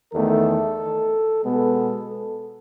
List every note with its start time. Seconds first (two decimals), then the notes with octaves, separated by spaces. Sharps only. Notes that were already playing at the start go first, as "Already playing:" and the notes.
0.12 E2 D#3 A3 A4
1.43 B2 G#3 B3 A4